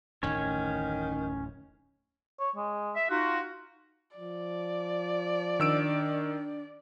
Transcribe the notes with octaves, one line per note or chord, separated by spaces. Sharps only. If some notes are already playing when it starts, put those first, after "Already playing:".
D1 A1 F2 D#3 C#4 C#5
C#5
G#3
E5
D#4 F4 F#4
F3 D5
D#3 D4 E6 D7